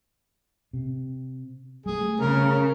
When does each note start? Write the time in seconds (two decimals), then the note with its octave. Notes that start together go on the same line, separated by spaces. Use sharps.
0.73 C3
1.86 G3 A3 G#4
2.20 C#3 A#4